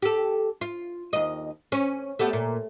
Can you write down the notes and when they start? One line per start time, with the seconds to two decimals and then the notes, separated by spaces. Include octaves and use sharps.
0.02 G4 A4
0.61 F4
1.13 D#2 D#5
1.72 C#4
2.19 A3 B3 G4
2.33 A#2